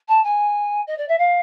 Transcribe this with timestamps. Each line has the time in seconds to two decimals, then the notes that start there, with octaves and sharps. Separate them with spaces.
0.08 A5
0.24 G#5
0.87 D#5
0.98 D5
1.09 E5
1.19 F5